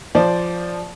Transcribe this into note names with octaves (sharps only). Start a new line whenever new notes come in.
F3 C5 D5